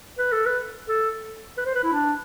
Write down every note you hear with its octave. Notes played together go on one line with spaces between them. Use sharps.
B4
A4
B4
A4
B4
C5
B4
E4
D4